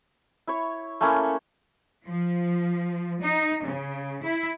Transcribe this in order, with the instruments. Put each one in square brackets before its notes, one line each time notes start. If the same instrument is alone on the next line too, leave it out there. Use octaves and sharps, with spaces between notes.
[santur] E4 C#5
A3 A#3 C#4 E4
[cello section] F3
D#4
C#3
E4